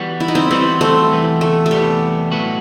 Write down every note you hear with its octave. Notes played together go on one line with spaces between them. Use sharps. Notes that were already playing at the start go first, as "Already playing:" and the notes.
Already playing: E3 G3 B3 F#4
E4
D#4
C4 E4
E3 G3 B3 C4 E4 F#4
A3 C4
E2 C3 E3 B3
A3
A3
E2 C3 E3 G3 B3
A2 F#3 B3 F#4